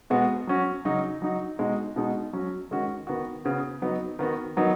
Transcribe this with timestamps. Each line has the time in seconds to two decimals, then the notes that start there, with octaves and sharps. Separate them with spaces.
0.10 B2 G#3 B3 F#4
0.47 F#3 C#4 F#4
0.85 C#3 F#3 D#4 F#4
1.22 F#3 D#4 F#4
1.59 B2 G#3 D#4 F#4
1.96 B2 G#3 D#4 F#4
2.33 F#3 C#4 F#4
2.71 D#3 G#3 C#4 F#4
3.07 D#3 B3 F#4
3.45 C#3 B3 F#4
3.82 F#3 B3 D#4 F#4
4.19 D#3 B3 F#4
4.56 D#3 F#3 B3 D#4